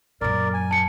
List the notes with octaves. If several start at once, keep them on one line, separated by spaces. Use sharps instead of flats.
F#2 A#2 A#4 D5
G#5
A5 C#7